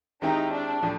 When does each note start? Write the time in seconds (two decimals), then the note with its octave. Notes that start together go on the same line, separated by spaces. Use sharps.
0.22 D#3 G#3 C4 D#4 E4 G4
0.53 D4
0.83 A2 F3